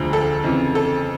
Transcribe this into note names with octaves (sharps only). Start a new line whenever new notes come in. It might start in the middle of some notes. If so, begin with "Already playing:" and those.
Already playing: E1 D2 D3 F3
A4
F2 C#3 E3
A4